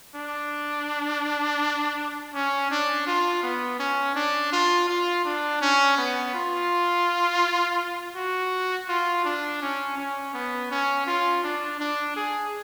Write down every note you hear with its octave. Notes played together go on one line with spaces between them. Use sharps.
D4
C#4
D4
F4
B3
C#4
D4
F4
F4
D4
C#4
B3
F4
F#4
F4
D4
C#4
C#4
B3
C#4
F4
D4
D4
G#4